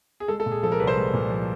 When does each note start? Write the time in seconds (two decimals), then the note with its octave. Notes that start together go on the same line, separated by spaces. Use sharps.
0.20 G#4
0.28 G#3 A4
0.40 A4
0.46 A#2
0.52 G#4
0.63 F3 A4
0.72 A#4
0.80 C2 B4
0.87 C5
0.96 G#3
1.13 A#2
1.30 F3